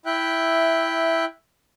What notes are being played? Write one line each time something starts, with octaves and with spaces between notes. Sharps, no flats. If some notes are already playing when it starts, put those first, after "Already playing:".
E4 E5 G5 F#6